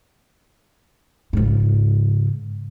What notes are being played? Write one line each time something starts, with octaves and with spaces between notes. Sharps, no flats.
G#2 C#3